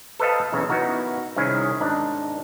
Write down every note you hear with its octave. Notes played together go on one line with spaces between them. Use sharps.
A4 B4 C5 D#5 F5 A5
B1 E2 A#2 C#3
B3 D#4 E4 F#4 A#4
C2 D#3 C#4 E4 G#4
G#1 D4 D#4